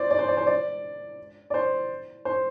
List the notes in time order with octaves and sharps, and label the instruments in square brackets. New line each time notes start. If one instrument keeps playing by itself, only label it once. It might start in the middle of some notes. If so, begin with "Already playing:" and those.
Already playing: [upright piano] C5 D5
D5
C5
D5
C5
D5
D5
C5
C5